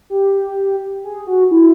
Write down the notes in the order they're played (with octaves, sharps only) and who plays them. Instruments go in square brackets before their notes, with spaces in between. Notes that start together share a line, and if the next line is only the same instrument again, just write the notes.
[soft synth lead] G4
G#4
F#4
E4